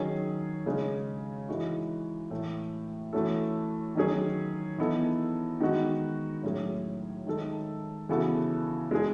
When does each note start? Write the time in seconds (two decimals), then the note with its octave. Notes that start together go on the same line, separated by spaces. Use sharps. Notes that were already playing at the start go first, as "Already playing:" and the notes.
Already playing: D#3 F#3 C#4 G#4
0.66 C#3 G#3 C#4
1.48 E3 G#3 D#4 F#4
2.31 A2 E3 A3
3.13 E3 A3 C#4 F#4 A4
3.95 D#3 F#3 C#4 G#4
4.78 E3 B3 D#4 A4
5.60 D#3 G#3 B3 D#4 F#4
6.43 A2 F#3 C#4 G#4
7.27 D#3 G#3 D#4 A4
8.09 C#3 E3 B3 F#4 A4
8.91 G#3 D#4 G#4